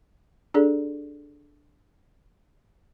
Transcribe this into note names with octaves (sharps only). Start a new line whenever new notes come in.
D4 G#4 A4 D5